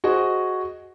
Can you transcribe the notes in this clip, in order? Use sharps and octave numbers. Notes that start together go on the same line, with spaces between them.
F#4 G#4 C5 D#5